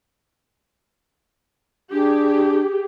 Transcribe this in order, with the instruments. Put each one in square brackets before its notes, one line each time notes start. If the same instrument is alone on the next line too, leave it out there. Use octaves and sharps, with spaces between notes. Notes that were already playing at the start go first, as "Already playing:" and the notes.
[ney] D4 [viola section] G4 G#4